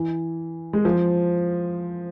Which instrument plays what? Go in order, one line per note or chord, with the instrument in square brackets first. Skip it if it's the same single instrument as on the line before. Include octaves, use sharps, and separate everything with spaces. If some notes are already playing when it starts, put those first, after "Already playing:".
Already playing: [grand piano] E3
G#3
F3